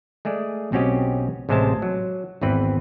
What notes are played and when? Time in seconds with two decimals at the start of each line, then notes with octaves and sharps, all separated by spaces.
0.25 G#3 A3 G#4 D5
0.72 B1 C4 C#4 F#4 G4 D#5
1.49 A1 C3 G#3 C5 E5 A5
1.82 F#3
2.41 G#1 E2 E3 C4 B4